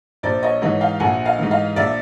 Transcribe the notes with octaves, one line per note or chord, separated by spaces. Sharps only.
A#1 C5 D5
C#5 D#5
G#2 E3 C#5 D#5
F5 G5
A#1 F#5 G#5
D#5 F5
G#2 E3
D#5 F5
A#1 D5 E5